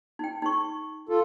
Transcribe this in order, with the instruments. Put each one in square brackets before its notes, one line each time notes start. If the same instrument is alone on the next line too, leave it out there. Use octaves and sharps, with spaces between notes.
[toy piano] D#4 G5
D#4 C#6
[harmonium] F4 A4